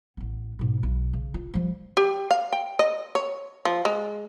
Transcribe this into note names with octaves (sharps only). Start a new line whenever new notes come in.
A1 B3
G#2 B2
B1
C#3
F4
F3 G3
G4
F5
G5
D#5
C#5
F3
G#3